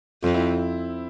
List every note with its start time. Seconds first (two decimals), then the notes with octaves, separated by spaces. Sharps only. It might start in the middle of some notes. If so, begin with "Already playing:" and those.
0.23 F2 C4
0.34 E4